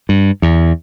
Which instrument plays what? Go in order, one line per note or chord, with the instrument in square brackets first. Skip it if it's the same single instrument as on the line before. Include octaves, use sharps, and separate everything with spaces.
[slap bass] G2
E2